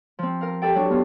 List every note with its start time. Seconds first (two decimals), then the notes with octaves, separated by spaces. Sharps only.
0.19 F3 C4
0.41 A#4 F5
0.62 G4 A4 D5 G5
0.75 F#3 D4
0.90 B3 F4